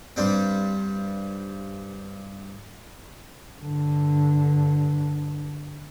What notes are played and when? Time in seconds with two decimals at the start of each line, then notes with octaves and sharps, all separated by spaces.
0.16 G2 G3 C4
3.61 G2 D3